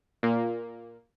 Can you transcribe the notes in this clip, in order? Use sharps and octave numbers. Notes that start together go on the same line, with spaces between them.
A#2 A#3